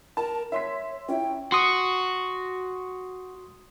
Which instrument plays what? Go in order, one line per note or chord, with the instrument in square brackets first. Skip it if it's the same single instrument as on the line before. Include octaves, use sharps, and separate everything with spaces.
[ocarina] A#4 [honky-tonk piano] A5
[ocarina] C#5 [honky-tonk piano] E5 C6 B6
[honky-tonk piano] C#4 E4 [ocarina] G5
[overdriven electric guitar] F#4 [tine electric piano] C6 D#6 C#7